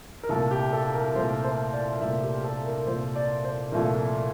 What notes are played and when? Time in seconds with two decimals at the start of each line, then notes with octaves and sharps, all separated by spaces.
0.23 A#4
0.29 C2 A#2 A3 A4
0.51 G4
0.73 A4
0.94 A#4
1.15 C2 A#2 A3 C5
1.44 C5
1.73 D5
2.01 C2 A#2 A3 E5
2.23 G4
2.44 A4
2.66 A#4
2.87 C2 A#2 A3 C5
3.16 D5
3.44 C5
3.72 C2 A#2 F3 A3 A#4